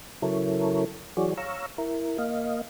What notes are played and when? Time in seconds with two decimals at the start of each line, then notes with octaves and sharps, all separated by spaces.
0.22 C#3 F#3 E4 A4 A#4 C#5
1.17 E3 F#3 F#4 G#4 C#5 D5
1.38 C#5 F5 A#5 C#6 E6
1.78 E4 A#4
2.18 A#3 D#5 F5